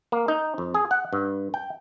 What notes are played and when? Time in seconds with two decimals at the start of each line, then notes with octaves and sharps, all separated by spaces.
0.12 A#3
0.28 D#4
0.58 F2
0.74 G#4
0.91 F#5
1.13 G2
1.54 G5